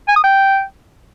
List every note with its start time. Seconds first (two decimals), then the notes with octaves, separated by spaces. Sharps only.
0.08 G#5
0.16 D#6
0.24 G5